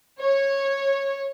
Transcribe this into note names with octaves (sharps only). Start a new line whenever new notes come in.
C#5